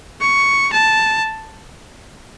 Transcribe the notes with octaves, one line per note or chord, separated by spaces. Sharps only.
C#6
A5